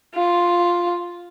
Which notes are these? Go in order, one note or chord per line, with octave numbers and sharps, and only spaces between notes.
F4